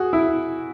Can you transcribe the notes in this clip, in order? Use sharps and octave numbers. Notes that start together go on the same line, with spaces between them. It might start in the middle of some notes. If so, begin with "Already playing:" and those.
Already playing: F#4 G#4
E4